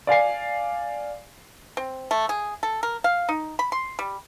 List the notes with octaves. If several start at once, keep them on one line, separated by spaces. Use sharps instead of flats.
D5 F5 G#5 C7
C4
A3
G#4
A4
A#4
F5
D#4
B5
C6
G3